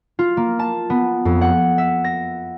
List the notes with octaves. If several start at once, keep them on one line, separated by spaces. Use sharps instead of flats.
F4
A#3
A5
B3
F2
F#5
E5
A#6